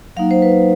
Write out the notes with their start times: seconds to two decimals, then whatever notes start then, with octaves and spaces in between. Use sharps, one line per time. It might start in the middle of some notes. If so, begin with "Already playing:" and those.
0.16 F#3 A#3 D#4 F5
0.31 C5
0.42 B4